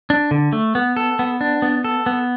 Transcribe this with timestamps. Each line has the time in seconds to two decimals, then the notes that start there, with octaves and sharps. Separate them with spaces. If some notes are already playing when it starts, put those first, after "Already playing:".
0.10 D4
0.31 D3
0.53 A3
0.75 B3
0.96 A4
1.19 B3
1.41 D4
1.62 B3
1.84 A4
2.06 B3